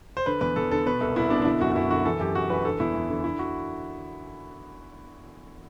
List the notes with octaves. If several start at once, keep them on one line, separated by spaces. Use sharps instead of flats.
C5
D3 B4
E2 B4
E2 A4
D3 A4
B2 B4
C2 A4
C2 E4
B2 D4
D4
D3 E4
F#2 F#4
F#4
F#2 E4
D3 F#4
E3 A4
F#2 G4
F#2 F#4
E3 B4
D3 A4
E2 E4
E2
D3
D3 E4
F#4